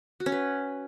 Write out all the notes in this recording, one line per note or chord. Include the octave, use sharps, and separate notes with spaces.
F#4
C#4
B4